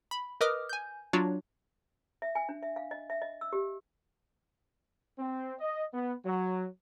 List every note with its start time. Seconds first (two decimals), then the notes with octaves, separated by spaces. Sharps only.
0.11 B5
0.41 A#4 B4 D#5 D6 D#6 F6
0.69 G#5 G6
1.13 F#3 D4 F4 F#4 C#5
2.22 E5
2.35 G#5
2.49 D4
2.62 E5
2.76 F5
2.91 D#5
3.10 E5
3.22 D#5
3.41 E6
3.53 G4
5.19 C4
5.60 D#5
5.94 B3
6.25 F#3